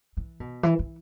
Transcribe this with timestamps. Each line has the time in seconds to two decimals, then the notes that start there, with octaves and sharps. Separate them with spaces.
0.17 E3
0.40 B2
0.63 E3
0.79 E3